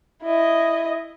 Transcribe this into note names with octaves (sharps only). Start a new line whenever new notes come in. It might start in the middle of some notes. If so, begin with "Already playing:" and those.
E4 D#5